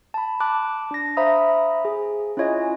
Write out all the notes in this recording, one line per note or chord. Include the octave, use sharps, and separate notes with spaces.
A5 B5
A5 D6 F#6
D4 A#6
C5 E5 F5 A#5 B5 D#6
G#4
C#4 E4 F4 C#5 D#5 G#5